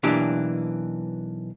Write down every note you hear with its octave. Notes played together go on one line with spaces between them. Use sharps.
B1 E3 A#3 D4 G4